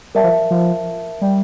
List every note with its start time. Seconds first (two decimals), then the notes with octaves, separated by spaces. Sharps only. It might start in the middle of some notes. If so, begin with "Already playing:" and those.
0.15 G3 A#4 E5 A5
0.24 F3
0.51 F3
1.21 G3